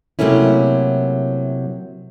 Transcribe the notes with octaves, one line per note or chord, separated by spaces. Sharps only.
C3 F#3 A3 A#3 C#4 E4